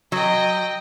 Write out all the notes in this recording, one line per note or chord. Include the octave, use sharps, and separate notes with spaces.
F#3 D#5 G5